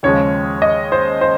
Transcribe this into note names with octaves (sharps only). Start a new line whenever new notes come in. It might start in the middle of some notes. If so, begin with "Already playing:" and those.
D#2 C#3 F3 G#3 C#5
D#5
C5
C5